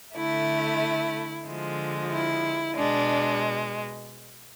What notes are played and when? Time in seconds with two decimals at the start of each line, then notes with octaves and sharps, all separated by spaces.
0.15 D3 A3 E4
1.46 D3 F3 G#3
2.11 E4
2.76 B2 G#3 D4